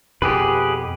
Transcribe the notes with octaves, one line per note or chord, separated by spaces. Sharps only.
F2 B2 G4 G#4 B4